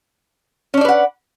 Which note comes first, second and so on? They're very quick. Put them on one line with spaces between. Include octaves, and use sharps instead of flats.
C#4 D4 D5 B4 F#5